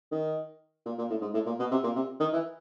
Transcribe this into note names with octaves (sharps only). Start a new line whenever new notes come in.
D#3
A#2
A#2
A2
G#2
A2
A#2
B2
C3
A#2
C3
D#3
E3